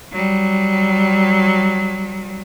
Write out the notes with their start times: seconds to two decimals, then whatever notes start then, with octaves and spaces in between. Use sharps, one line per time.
0.13 F#3 G3